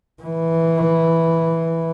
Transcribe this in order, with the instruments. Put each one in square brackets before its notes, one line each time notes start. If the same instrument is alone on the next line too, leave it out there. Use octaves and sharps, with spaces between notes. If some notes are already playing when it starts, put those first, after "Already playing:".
[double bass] E3